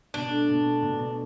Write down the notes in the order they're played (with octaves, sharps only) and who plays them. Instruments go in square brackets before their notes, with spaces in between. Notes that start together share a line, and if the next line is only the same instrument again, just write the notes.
[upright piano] B2 [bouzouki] D4
[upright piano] A3
B2
A3
B2
B2